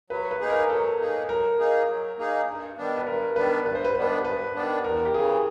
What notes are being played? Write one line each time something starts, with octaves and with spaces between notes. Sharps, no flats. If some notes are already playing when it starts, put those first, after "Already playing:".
F#3 B4
B4
A#3 D#4 G#4
A#4
F#3 A4
A#3 D#4 G#4
F#3 A#4
A#3 D#4 G#4
F#3
A#3 D#4 G#4
G2
D#3 G3 B3 D4
B4
G2 A#4
D#3 G3 B3 D4 B4
G2 B4
C5
B4
D#3 G3 B3 D4 B4
G2 B4
D#3 G3 B3 D4
E2 A#4
G4
C#3 E3 G#4